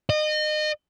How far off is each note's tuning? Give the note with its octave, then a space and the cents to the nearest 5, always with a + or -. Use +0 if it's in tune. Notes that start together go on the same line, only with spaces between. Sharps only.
D#5 -30